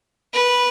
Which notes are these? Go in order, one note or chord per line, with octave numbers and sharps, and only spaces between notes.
B4